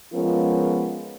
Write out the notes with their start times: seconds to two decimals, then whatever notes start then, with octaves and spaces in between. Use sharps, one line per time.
0.13 F3 G#3 B3 C#4 F4 A#4